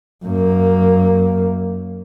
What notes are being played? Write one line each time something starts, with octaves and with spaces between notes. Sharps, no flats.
F#2 A#3